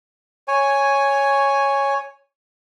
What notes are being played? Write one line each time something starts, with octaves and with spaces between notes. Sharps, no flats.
C#5 G#5